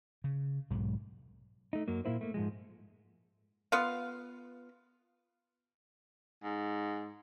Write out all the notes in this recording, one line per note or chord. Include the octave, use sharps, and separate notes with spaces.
C#3
B1 G#2 F#3
A3 D#4
F#2 F#3 A#3
A#2 C#3 A#3 E4 C5
A3 A#3
G#2 F3 G#3
B3 F4 F5
G#2